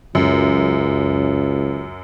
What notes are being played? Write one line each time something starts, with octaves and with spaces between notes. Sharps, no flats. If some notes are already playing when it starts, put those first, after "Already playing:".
C#2 F#2